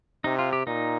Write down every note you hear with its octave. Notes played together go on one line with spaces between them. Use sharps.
C3 D#4
F4
G4
A#2 D#4